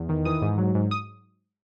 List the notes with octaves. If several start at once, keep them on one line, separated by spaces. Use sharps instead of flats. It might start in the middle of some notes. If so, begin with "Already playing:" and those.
Already playing: E2
D#3
E3 D#6
G#2
F#3
G#2
D#6